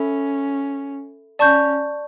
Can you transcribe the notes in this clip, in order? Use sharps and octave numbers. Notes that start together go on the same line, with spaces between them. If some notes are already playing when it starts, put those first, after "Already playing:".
Already playing: C#4 A4 E5 B5
C#4 D5 A5 C#6 G6